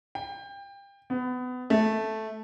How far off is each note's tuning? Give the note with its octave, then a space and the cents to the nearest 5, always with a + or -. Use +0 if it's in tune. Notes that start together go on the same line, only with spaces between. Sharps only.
G5 +25
B3 +25
A3 -5